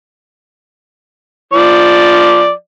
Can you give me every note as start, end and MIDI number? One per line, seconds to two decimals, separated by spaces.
1.53 2.51 53
1.53 2.51 74